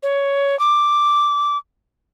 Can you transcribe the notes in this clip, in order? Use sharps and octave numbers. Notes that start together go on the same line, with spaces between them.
C#5
D6